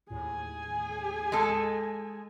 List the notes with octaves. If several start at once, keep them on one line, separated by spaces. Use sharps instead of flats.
D#2 A2 G#4 G#5
G#3 A4